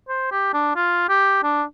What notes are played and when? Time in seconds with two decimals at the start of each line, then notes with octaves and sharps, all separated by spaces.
0.09 C5
0.32 G4
0.54 D4
0.76 F4
1.09 G4
1.43 D4